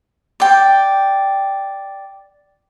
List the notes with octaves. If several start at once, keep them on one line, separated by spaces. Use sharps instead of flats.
D5 G5